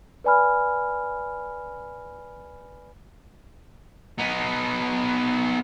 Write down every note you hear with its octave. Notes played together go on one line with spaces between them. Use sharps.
B4 D5 G#5 B5 F6
B3 D#4